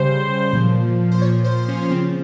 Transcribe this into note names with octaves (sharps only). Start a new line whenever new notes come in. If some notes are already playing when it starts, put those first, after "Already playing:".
Already playing: C#3 G3 C5
A#2 F3
C5
A#2 F3 C#5
C5
C#4
C#3 F3 C4